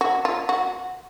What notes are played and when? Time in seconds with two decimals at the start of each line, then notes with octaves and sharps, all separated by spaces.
0.01 F#4
0.25 F4
0.49 F#4